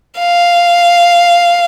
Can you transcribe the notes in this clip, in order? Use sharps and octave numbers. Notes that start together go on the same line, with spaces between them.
F5